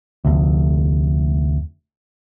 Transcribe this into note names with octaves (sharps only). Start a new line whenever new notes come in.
F1 D2